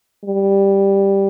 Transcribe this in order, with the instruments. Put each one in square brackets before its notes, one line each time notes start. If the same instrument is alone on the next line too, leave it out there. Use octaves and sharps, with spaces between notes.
[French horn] G3